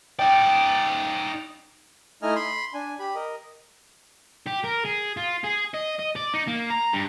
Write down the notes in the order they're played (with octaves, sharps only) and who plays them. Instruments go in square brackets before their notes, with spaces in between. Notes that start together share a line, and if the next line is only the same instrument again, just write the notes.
[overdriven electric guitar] D#4 D5 [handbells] G5
[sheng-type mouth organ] A3 D#4 E4 D#5 G#5 F6
B5 C6
D4 G#5
G4 B5
A#4 D#5
[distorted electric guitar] G4
A#4
G#4
F4
G#4
D#5
D#5
D5
D#4
A#3
A#5
G2